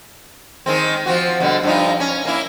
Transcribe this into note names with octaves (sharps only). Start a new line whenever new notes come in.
D#3 G#3 C4
F3 C4 F#4
B2 D3 G3
G2 F3 D#4
C#4
A#3 E4